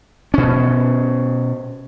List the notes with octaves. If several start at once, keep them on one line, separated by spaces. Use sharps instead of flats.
B2 C#4